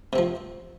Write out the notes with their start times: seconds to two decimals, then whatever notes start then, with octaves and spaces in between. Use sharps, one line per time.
0.13 C3
0.16 C4
0.18 F3